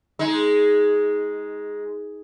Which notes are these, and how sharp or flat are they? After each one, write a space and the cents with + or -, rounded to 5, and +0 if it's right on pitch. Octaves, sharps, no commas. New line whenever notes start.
G#3 +0 D#4 +20